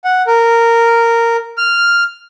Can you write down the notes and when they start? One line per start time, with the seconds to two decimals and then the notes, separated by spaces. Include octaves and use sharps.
0.05 F#5
0.27 A#4
1.58 F6